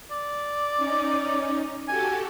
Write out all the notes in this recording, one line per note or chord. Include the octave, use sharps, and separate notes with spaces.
D5
C#4 D#4
F#4 G4 A4 G#5